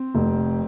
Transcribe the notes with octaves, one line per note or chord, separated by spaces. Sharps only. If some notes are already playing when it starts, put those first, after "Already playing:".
Already playing: C4
F1